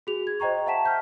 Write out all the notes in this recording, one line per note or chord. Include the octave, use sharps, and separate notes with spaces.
F#4 G#4 F7
G#6
C5 D#5 G5 A#5 C#6
E5 F#5 G5 A5 B6 E7
F6 G6